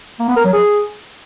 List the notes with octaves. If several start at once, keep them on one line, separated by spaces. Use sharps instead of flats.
A#3
B3
A#4
F#3
G#4